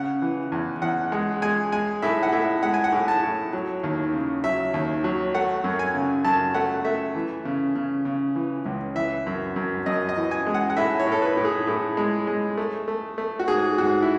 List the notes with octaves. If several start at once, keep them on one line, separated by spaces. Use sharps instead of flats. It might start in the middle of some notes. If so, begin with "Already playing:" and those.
Already playing: C#3 F#5
E3
E2
E2 F#5
G#3 F#5
G#3 G#5
G#3 G#5
A2 E5
F#5
A2 E5
G#3 F#5
G#5
F#5
A2
A5
A2
F#3
D#2
C#3
F#3 E5
D#2
F#3
A3 F#5
F#2
G#5
C#3
F#2 A5
A3 F#5
A3 E5
E3
C#3
C#3
C#3
E3
C#2
E3 E5
F#2
F#2
F#2 D#5
D#5
E3
G#5
G#3
F#5
F#5
A2 E5
C#5
A2
A4
B4
A2
G#4
A2
G#3
G#3
A3
A3
A3
F#4
G#2 G#4
G#2 F#4
E4